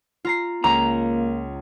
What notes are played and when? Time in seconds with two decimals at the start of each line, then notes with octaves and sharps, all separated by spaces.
0.25 F4 A#5 C7
0.64 C#2 A#3 A#5